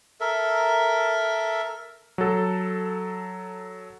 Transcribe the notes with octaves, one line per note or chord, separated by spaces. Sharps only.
A4 A#4 E5
F#3 A4